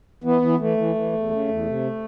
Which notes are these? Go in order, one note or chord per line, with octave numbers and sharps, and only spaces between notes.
E3 B3
E3
E3 A3
E3
E3
E2
C#3
E2
C3